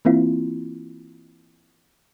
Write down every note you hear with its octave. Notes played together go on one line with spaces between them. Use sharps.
E3 A#3 C4 E4 F4